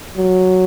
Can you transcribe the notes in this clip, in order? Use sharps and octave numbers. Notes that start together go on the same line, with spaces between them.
F#3